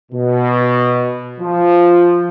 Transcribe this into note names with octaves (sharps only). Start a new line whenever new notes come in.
B2
F3